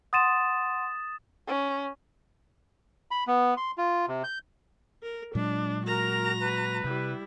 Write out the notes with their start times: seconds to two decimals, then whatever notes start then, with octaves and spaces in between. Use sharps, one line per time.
0.13 F#5 C6 D#6 A6 D#7 E7
1.48 C#4
3.11 B5
3.27 B3
3.57 C6
3.78 F4
4.08 C3
4.24 G6
5.03 A#4
5.35 A#2 F#3 G#3 D4
5.86 F#4 A#4 A#5
6.39 B4
6.84 C3 G3 E4